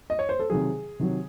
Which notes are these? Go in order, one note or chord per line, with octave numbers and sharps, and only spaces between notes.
D#5
C#5
C5
A4
C3 D#3 F#3 G#4
C3 D#3 F#3